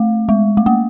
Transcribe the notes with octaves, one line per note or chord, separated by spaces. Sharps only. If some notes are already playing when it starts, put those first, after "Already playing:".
Already playing: A3
G#3
A3
A#3